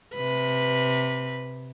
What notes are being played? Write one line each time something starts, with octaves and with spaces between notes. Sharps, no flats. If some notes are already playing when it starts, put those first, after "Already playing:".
C3 B4